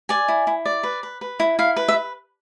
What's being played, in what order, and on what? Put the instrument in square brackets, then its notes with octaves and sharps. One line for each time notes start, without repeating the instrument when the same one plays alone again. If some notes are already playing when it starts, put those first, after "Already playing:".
[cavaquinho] D5 G#5
E4
E4
D5
B4
B4
B4
E4
E4 F5
B4
E5